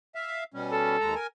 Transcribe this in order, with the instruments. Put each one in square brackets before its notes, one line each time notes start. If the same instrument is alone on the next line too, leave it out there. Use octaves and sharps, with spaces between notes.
[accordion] E5 F5
B2 G3 C#4
[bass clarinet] A4
[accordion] D#2 G#3 A#5
A#4 G#5